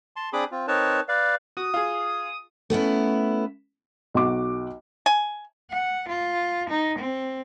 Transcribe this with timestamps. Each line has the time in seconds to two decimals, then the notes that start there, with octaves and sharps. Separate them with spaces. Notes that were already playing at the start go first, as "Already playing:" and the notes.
0.16 A5 C6
0.33 C4 D4 G#4 B5 D6 D#6
0.52 C4 F4
0.68 C4 D#4 A#4 B4 C#5 A5
1.09 B4 D5 F5
1.57 F#4 D#6
1.74 F4 G#4
2.70 A3 B3 C#4 E4
4.14 B1 F#4 D6
5.06 G#5
5.71 F#5
6.09 F4
6.69 D#4
6.99 C4